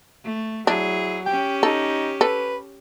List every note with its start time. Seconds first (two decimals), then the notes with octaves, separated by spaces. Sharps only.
0.24 A3
0.67 F#3 D4 E4 G#4
1.26 C#4 G4 G5
1.63 D#4 A4
2.21 A4 B4